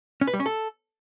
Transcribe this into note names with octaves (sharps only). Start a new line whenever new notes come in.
C#4
B4
G3
C#4
A4